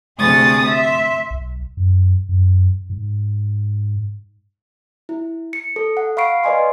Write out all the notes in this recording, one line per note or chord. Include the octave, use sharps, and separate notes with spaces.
D2 C3 G#4 C#6 D#6 A6
E5 C6
B1
F#2
F#2
G#2
E4
C#7
A4
F#5
F5 B5 C#6 C7 D7
B4 D5 D#5 G#5 C6